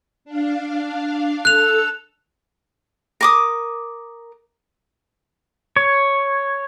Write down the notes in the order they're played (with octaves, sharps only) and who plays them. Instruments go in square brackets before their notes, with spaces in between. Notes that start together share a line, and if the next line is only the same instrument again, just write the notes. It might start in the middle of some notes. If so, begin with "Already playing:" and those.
[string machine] D4 F5
[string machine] A4 E6 [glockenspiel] F#6 F7
[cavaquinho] A#4 D6 D#6
[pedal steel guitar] C#5